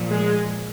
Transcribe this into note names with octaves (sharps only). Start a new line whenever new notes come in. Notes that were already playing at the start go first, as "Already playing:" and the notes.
Already playing: A#2 F3
G#3